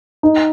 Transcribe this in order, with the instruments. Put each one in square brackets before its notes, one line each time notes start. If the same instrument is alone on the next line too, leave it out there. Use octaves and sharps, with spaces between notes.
[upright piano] D#4